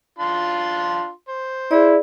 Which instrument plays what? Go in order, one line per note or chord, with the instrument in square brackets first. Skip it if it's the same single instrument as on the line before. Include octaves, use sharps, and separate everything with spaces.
[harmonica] D4 F4 C6
C5
[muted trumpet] E4 [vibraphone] G#4 D5